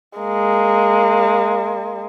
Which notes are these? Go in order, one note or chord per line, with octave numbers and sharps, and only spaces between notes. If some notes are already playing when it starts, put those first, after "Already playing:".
G#3 A#3